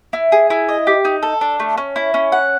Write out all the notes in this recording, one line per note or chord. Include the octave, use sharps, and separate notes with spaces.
E4
G#4
E4
D#5
G4
D#4
A4
D4
A3
C#4
E4
C#4
F#5